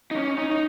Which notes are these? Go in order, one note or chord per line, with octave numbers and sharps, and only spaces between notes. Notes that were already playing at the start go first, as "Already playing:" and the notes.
D#4
C#4
D#4
D#4